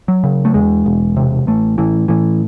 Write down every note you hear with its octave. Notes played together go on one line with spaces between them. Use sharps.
F#3
C#3
A3
E2 G#3
E1
C3
A1 A3
A2 E3
A2 E3